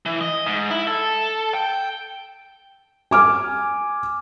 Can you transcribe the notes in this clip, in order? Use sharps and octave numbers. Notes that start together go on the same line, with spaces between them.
E3
D#5
G#2
E4
A4
G5
G#5 D6 F6